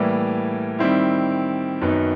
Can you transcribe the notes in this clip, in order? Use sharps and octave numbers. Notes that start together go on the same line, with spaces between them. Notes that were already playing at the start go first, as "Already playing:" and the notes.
Already playing: A2 E3 G3 A#3
D#3 G3 C4 E4
F#2 D#3 F#3 B3 D#4